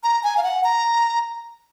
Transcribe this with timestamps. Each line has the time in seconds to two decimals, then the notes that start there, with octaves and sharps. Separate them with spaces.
0.03 A#5
0.23 G#5
0.37 F5
0.44 F#5
0.64 A#5